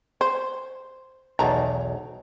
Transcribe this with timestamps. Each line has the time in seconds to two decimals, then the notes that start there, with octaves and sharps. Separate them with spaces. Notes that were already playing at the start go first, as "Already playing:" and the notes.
0.21 C5
1.39 B1 E2 D#3 A5 A#5